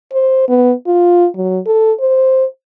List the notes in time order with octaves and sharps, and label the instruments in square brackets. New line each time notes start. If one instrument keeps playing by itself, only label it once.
[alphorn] C5
B3
F4
F#3
A4
C5